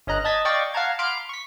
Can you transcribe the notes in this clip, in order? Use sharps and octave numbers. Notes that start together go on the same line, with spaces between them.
G1 C#4 D#5 A#5 F#6
D#5 A5 G#6 A6 B6
D5 D#5 F5 G5 C#6 A6
F5 F#5 A5 A#5 G#6
B5 C6 D6 F6 D7
C#6 B6